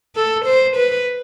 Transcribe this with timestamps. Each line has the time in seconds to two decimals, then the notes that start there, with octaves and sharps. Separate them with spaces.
0.16 A4
0.45 C5
0.76 B4